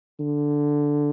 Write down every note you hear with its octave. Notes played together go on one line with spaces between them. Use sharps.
D3